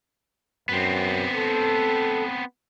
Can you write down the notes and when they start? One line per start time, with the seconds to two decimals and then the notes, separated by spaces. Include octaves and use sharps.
0.69 F#2 B3 C4
1.33 A4